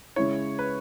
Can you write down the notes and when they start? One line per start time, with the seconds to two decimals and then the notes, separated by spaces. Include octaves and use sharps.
0.16 C#3 G#3 E4 C#5
0.59 B4